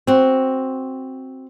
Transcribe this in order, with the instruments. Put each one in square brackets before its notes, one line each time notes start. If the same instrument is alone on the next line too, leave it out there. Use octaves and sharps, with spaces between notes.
[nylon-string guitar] C4 F#4